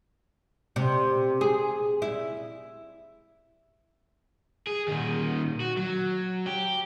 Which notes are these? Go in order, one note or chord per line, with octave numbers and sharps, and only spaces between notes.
C3
G#4
E4
G#4
A#2 D#3
F#4
F#3
G4